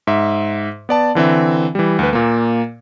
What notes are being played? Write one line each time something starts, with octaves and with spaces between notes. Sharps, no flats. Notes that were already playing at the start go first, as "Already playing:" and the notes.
G#2 E5
B3 D5 A5
D3 E3 C4 E5
E3 G3
D2 B4
A#2 A#3